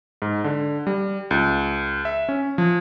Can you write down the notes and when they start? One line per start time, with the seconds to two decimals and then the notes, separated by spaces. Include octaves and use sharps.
0.22 G#2
0.44 D3
0.87 G3
1.31 C#2
2.05 E5
2.29 C#4
2.58 F3